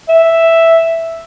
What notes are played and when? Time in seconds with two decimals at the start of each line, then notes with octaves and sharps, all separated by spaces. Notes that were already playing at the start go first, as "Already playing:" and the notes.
0.09 E5